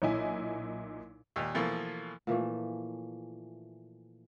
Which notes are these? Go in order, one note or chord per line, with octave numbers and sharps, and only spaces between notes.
B1 A#2 D#4 E4 G#5
D#2 A#2
B2 E3 F3 A3 A#3
A#2 E3 F3 A3